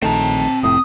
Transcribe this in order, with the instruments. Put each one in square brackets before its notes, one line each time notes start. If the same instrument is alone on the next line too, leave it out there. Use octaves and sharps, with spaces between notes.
[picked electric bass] A#1 D#3 A3 [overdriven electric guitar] C4 A#5 [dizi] A5
[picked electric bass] F1 A2 [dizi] D#6